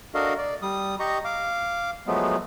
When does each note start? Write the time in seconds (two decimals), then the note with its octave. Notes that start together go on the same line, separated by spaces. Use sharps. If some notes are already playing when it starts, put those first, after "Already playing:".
0.14 D4 F#4 A4 A#4 D#5 F5
0.38 D5
0.62 G3 D#6
1.00 G4 D#5 A#5 C#6
1.25 F5 D6
2.07 F3 F#3 G#3 A3 B3